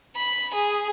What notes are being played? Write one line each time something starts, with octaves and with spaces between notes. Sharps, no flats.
B5
G#4